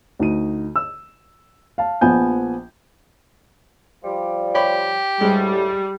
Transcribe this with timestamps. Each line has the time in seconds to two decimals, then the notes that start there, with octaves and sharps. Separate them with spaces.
0.19 D2 D#4 D#7
0.76 E6
1.78 F5 A5
2.01 A#1 F3 B3 G#5 G6
4.03 F3 G3
4.55 G4 C#5 B5
5.21 D2 A2 G3 G#3